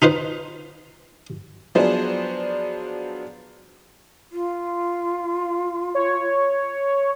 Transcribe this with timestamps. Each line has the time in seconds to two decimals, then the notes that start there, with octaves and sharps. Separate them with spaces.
0.02 D#4 F4 B4 C5
1.75 F3 F#3 B3 D4 G#4 C5
4.32 F4
5.95 C#5